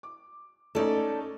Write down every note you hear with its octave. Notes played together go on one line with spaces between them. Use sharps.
D6
A3 C#4 D#4 A4 D5